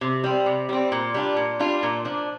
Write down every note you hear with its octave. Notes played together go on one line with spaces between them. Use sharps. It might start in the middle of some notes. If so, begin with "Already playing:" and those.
C3
G3 C4
C3
G3 C4
A#2
G3 D4 F4
A#2
G3 D4 F4
A#2
F3 D4